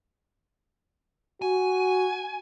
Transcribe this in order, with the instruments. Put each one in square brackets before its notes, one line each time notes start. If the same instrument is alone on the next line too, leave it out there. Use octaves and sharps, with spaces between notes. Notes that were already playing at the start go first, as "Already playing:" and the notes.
[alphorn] F#4 [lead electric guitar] G#5